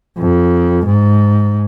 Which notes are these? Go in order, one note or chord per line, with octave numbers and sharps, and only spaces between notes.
F2
G#2